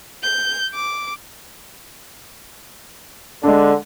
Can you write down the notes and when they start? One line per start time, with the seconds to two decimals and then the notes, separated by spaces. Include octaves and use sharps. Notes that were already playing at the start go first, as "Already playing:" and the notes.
0.23 G6
0.74 D6
3.43 D3 G#3 D4